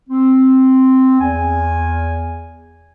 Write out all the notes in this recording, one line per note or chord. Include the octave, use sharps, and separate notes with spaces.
C4
E2 G#5